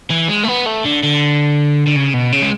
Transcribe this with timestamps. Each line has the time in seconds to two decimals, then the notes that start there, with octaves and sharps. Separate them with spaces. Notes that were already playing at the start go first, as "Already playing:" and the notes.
0.10 E3
0.28 G#3
0.43 A3
0.47 B3
0.66 A3
0.84 D3
1.03 D3
1.87 D3
1.96 C#3
2.14 B2
2.32 C#3
2.42 G#3